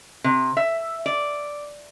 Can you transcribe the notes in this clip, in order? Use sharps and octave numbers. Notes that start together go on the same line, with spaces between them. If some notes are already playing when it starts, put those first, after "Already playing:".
C3
E5
D5